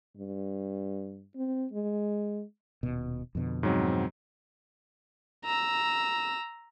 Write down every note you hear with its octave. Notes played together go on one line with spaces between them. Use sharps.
G2
C4
G#3
D#1 B2
F2 B2 D3
G#2 F#3 C4
A#5 E6